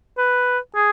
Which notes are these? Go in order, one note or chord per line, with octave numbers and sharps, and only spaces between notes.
B4
G#4